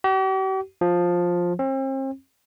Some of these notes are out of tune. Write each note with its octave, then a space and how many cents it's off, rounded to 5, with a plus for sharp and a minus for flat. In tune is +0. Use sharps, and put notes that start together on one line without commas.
G4 -45
F3 +10
C4 +40